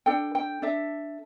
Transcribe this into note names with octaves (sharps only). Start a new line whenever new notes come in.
D4 A4 G5
G5
D4 A4 E5